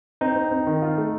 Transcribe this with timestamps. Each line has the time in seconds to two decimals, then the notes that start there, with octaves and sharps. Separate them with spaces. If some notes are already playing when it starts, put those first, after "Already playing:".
0.21 C4 D#4
0.36 C4
0.51 C4
0.67 D#3
0.82 F4
0.98 A3